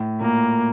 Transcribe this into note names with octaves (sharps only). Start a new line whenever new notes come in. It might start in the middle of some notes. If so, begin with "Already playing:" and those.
Already playing: A2
A#2 A#3